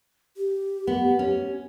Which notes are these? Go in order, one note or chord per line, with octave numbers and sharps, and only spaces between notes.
G4
B3
C#4